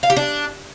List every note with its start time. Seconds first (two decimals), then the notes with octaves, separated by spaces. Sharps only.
0.03 F5
0.10 G4
0.17 D4